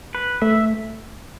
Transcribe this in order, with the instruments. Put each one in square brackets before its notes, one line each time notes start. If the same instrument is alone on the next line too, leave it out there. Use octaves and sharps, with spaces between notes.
[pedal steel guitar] B4
[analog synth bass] A3 [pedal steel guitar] E5